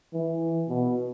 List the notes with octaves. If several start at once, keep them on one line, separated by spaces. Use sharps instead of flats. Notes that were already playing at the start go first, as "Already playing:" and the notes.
E3
B2